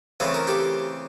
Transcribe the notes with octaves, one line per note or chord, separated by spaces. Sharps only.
C#3 E3 A3 C4 A4
A#4
G4 A4